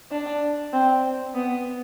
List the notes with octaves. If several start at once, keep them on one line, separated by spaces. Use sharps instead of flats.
D4
C4
B3